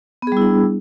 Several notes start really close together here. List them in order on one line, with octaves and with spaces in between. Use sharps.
B3 G#4 G3 E4 D4